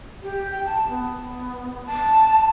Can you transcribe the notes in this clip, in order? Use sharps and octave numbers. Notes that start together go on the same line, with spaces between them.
G4
G5
A5
B3
A5